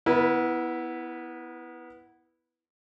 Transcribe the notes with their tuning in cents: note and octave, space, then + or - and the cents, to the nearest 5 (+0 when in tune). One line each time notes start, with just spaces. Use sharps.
B3 +0 E4 -5 A#4 +45